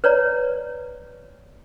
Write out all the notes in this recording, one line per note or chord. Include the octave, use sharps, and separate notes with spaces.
B4 C#5 D5 A#5